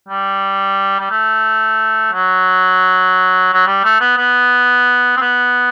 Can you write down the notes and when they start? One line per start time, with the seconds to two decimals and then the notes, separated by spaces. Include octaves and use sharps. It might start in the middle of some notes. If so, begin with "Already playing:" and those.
0.08 G3
0.99 G3
1.10 A3
2.13 F#3
3.54 F#3
3.67 G3
3.84 A3
4.01 B3
4.18 B3
5.17 C4
5.21 B3